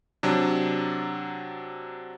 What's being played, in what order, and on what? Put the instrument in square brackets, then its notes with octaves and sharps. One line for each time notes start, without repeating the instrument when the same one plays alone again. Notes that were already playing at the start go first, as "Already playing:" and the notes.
[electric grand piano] C3 F#3 D4